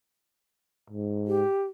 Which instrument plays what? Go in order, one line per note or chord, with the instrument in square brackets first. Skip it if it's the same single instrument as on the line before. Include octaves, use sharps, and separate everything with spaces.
[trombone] G#2
[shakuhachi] G4